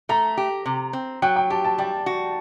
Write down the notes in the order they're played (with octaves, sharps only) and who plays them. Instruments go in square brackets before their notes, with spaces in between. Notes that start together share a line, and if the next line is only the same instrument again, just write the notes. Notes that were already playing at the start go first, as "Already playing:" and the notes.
[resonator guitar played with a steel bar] A3 [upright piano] A#5
[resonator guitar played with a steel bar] G4
C3
C4
[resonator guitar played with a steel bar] F#3 [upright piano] G5
[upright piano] G5
[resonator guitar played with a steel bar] G4 [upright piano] A5
[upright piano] A5
[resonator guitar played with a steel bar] G3 [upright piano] G5
[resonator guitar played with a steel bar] F#4